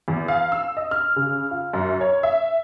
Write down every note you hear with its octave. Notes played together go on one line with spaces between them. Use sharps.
E2
F5
E6
D#5
F6
C#3
F4
F#2
C#5
E5